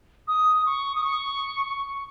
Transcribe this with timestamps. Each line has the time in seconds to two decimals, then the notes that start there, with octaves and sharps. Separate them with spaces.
0.28 D#6
0.66 C#6
0.96 D#6
1.04 C#6